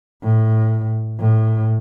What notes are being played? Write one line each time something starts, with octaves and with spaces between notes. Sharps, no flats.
A2
A2